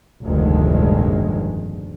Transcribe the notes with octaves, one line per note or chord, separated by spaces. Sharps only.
F1 D2 G2 A#2 D#3 G#3